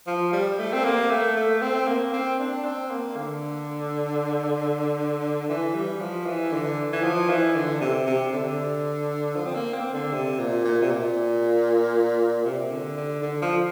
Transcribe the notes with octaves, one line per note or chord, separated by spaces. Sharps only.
F3
G3
A3
C4
A#3
A3
A3
C4
A#3
C4
D4
C4
A#3
D3
E3
G3
F3
E3
D3
E3
F3
E3
D3
C3
C3
D3
F3
C4
A#3
C4
D3
C3
A#2
A#2
C3
A#2
C3
D3
D3
D3
F3